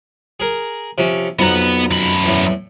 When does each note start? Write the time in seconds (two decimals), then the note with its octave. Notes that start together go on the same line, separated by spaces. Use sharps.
0.40 G#4 A#4
0.98 C3 F3 C#4
1.39 B1 F2 B3 F#5 A#5
1.91 F#2 B5
2.24 E2 A2